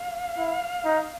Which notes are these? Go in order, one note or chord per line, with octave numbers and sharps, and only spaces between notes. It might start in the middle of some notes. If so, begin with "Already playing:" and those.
Already playing: F5
E4
D#4